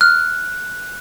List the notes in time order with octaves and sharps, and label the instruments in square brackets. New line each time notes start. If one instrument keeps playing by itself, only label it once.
[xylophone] F6 [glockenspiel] F#6